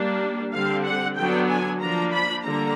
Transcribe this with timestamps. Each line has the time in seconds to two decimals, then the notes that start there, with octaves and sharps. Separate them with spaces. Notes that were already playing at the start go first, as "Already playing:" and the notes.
Already playing: G3 A#3 D4
0.52 D3 G3 C4 F5
0.84 F#5
1.16 D3 F#3 B3 D4 G5
1.48 G#5
1.80 F3 A#3 D4 A#5
2.12 B5
2.43 D3 G3 A#3 A#5